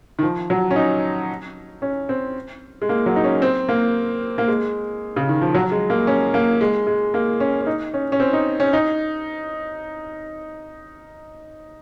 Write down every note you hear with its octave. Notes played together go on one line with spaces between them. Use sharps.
D#3
F3
F#3
C#4
D#4
C#4
C4
G#3
A#3
F#3
D#4
C#4
C4
A#3
A#3
G#3
C#3
D#3
F3
F#3
G#3
A#3
C#4
A#3
G#3
G#3
A#3
C#4
C#4
D#4
C#4
C#4
C4
D#4
C#4
D#4